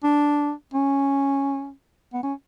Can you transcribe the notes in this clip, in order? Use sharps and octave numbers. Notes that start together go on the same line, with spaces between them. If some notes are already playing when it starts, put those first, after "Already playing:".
D4
C#4
B3
C#4